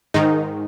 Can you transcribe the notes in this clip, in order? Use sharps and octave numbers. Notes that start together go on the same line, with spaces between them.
G#2 D#3 D#4